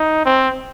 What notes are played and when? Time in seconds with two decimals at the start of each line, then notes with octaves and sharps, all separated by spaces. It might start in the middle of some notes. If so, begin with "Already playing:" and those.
Already playing: D#4
0.25 C4